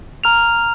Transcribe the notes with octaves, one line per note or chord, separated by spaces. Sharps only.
A#5 F6 F7